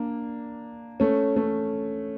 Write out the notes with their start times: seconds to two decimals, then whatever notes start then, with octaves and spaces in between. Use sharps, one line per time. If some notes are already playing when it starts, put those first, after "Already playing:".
Already playing: A#3 D4
1.00 A3 C#4
1.36 A3 C#4